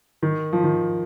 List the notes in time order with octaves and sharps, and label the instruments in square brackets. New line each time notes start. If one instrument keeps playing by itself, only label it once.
[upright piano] D#3
F3
D#3